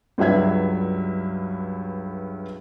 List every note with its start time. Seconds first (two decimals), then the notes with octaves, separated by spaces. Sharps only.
0.18 C#2 G2 F#3 E5 G#6